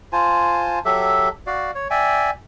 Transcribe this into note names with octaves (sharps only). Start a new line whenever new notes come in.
F4 C5 G#5 A5
F#3 G4 A4 E5
F#4 D5 F5
C#5
D5 E5 G5 G#5